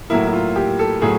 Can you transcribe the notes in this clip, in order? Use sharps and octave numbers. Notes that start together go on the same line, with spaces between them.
A2 F#3 A#3 E4
E4
F4
G4
A4
A2 F#3 G#4